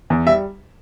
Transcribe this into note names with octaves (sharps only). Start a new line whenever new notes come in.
E2
G3 E5